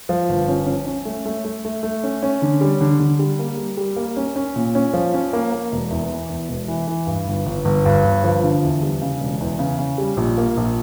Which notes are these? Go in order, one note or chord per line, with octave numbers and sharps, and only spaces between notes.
F3
G1
C#4
C#4
C#4
A3
A3
A3
A3
A3
C#4
C#4
D3
G3
D3
D3
G3
A#3
G3
G3
A#3
C#4
C#4
A#2
C#4
F3
C#4
A#3
A#3
E1
E2
E3
E2
E1
E3
E3
G2
G1
G1
G1
G2
G1
F3
D3
E2
G3
C#3
E1
E2
C#3
C#3
G3
A#1
A#3
A#1